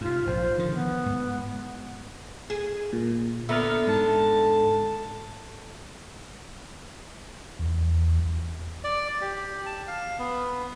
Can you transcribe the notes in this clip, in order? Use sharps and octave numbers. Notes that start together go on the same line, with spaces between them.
G#2 C3 F4
A#1 G#2 C5
D3 D#3 F3
B3
G#2
G#4
A#2
D3 B3 E5 A#5 F6
G#2 A5
E2
D5
G4
A5
F5
B3